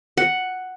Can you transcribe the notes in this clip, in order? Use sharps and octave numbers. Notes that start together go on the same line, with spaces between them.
F#5